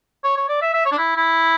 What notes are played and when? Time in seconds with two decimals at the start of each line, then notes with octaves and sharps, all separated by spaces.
0.24 C#5
0.37 C#5
0.49 D5
0.62 E5
0.74 E5
0.85 C#5
0.92 D4
0.98 E4
1.17 E4